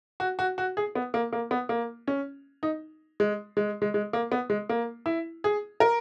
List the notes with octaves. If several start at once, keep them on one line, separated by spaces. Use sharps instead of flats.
F#4
F#4
F#4
G#4
B3
A#3
A#3
B3
A#3
C#4
D#4
G#3
G#3
G#3
G#3
A#3
B3
G#3
A#3
E4
G#4
A#4